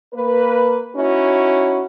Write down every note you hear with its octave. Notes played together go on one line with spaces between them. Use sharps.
A#3 B4
C#4 D#4 E4 F#4